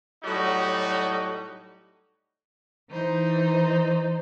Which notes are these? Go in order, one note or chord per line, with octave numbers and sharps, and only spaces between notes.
A2 F#3 G3 D#4 F#4
E3 D#4 C5